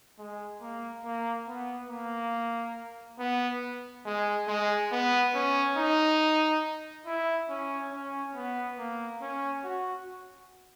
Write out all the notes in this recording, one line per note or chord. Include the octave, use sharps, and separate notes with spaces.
G#3
A#3
A#3
B3
A#3
B3
G#3
G#3
B3
C#4
D#4
E4
C#4
C#4
B3
A#3
C#4
F#4